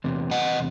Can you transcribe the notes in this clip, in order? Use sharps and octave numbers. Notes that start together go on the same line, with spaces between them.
E2 C3
D#5 F#5